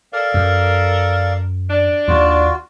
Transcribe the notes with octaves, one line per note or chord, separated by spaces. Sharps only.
A4 A#4 D5 F5
F#2
D4
D#2 F4 F#4